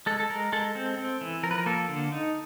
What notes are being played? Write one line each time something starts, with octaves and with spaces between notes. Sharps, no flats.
G#3 A4
A4
G#3 A#4
G#3 A4
C4
C4
E3
F3 A#4
B4
A#4
A#3 A4
D3
D#4